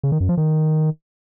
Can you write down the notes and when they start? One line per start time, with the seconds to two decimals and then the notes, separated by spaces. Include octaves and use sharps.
0.04 C#3
0.12 D#3
0.20 F#2
0.29 F3
0.37 D#3